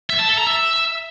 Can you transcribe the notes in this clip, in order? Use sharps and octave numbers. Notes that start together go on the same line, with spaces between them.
E5
A5
A4
A#5
E5